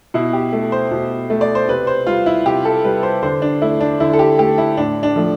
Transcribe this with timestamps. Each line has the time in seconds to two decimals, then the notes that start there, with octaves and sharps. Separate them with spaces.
0.14 B2 E4
0.33 G4
0.53 A3
0.72 C5
0.91 B2
1.30 A3
1.41 D5
1.55 C5
1.69 C3 B4
1.87 C5
2.07 G3 F4
2.26 E4
2.46 C3 G4
2.65 A4
2.84 G3 B4
3.03 C5
3.23 D3 C5
3.42 D4
3.62 A3 E4
3.81 D4
4.00 D3 E4
4.13 A4
4.19 G4
4.39 A3 G4
4.58 E4
4.77 A2 D4
5.03 D4
5.16 F3 A3